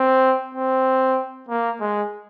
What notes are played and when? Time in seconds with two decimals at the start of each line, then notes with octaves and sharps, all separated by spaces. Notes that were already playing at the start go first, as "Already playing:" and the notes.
Already playing: C4
0.55 C4
1.49 A#3
1.80 G#3